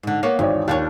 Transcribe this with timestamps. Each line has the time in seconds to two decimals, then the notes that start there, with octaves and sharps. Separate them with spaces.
0.03 G#2 D3
0.23 A#3 B3 C#5
0.39 G#1 E2 C#5 D5
0.68 D#2 D4 F4 C#5